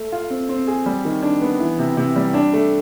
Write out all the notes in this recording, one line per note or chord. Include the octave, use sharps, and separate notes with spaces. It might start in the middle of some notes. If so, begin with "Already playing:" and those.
Already playing: A3
F4
C4
C4
G#4
G3
D#3
D4
B3
E3
C3
C3
G3
D4
A3